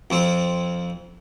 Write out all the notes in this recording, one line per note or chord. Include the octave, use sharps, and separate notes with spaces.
F2 C4